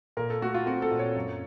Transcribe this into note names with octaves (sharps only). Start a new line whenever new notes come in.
A#2 A#4
A4
A3 F#4
F4
C4 F#4
A4
A#2
C#5
F#2